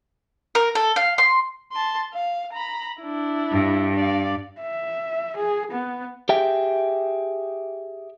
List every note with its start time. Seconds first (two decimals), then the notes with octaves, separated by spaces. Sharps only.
0.55 A#4
0.75 A4
0.96 F5
1.18 C6
1.72 A5 C6
2.13 F5
2.53 A#5 B5
3.01 D4 E4
3.52 G2
3.95 D5 F5
4.61 E5
5.37 G#4
5.72 B3
6.29 G4 G#4 E5 G5